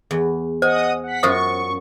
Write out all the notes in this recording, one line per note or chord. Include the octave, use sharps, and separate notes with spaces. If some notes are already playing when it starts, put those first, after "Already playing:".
E2
C5 D#5 F#5 G#5 D#6
F#5 B6
F#2 F4 F#4 C5 C#6 D#6